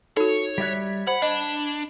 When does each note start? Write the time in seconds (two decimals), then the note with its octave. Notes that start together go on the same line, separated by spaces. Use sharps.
0.17 D#4 F#4 A4 C#5
0.58 G3 E5 F#6 G#6 B6
1.07 C5 F#5 B5
1.22 D4 D#5